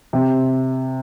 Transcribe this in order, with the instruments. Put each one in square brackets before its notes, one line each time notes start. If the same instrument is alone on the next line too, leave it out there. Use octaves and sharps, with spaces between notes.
[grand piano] C3